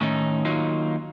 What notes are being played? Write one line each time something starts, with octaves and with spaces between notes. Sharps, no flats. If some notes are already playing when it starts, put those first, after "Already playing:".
A2 D#3 C#4 D#4
D#3 F#3 A#3 D#4 F4